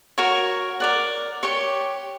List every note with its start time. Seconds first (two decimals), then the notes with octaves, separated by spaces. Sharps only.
0.18 F#4 A#4 C#5
0.80 A#4 D5 F#5
1.43 G4 C#5 G5 C#6